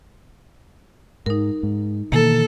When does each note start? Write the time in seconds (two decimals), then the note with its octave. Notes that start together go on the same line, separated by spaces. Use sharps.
1.26 G#2 D#4 A#4
1.63 G#2
2.12 B2 D#3 E3 A#3 A4